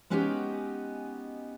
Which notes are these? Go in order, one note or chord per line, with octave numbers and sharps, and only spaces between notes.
G#3 B3 C#4 D#4 F#4 G4